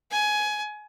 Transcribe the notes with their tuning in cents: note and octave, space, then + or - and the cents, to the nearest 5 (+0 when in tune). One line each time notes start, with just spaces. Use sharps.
G#5 +20